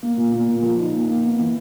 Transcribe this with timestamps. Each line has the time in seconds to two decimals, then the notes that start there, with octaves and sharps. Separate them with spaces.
0.03 A#3
0.17 A#2
0.32 A#3
0.48 A#2
0.63 F3
0.79 D#4
0.93 A#3
1.08 A#3
1.24 B3
1.39 E3